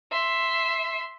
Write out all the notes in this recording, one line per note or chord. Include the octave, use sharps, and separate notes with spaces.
E5 C6